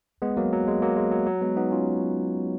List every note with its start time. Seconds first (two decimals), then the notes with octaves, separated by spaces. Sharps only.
0.22 G#3 B3
0.37 F#3 A#3
0.53 F#3
0.68 G#3
0.82 F#3 A#3
0.97 G#3
1.12 F#3
1.26 F#3
1.41 G#3 B3
1.56 B3 D#4
1.71 C#4 F4